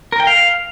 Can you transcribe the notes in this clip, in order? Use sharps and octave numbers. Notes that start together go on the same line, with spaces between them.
A#4
G5
F5